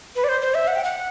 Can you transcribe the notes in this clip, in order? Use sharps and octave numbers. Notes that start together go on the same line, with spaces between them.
B4
D5
C5
C5
E5
F#5
G5
F#5